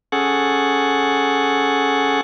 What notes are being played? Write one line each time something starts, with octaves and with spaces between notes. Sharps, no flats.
C#4 G#4 A4 F#5